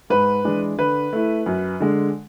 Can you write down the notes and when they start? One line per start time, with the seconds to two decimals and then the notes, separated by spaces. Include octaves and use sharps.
0.10 G#2 B4
0.44 E3 G#3 D4
0.78 D3 B4
1.13 A3 E4
1.46 F#2
1.80 D3 G#3